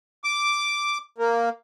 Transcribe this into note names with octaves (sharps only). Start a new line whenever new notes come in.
D6
A#3